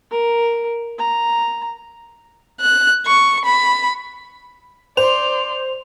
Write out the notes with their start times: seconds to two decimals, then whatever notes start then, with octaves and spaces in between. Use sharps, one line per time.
0.11 A#4
0.98 A#5
2.61 F#6
3.06 C#6
3.45 B5
4.97 C5 D5 C6 F7